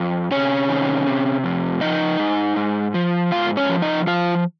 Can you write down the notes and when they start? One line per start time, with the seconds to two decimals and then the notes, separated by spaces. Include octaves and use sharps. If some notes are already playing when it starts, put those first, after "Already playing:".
Already playing: F2
0.31 C3 C#4 C#5
0.69 D#3
1.07 C3
1.44 F2
1.81 F3 D#4 D#5
2.19 G#2
2.56 G#2
2.94 F3
3.32 G#2 F4 F5
3.57 C#4 C#5
3.69 F3
3.82 D#4 D#5
4.07 F3 F4 F5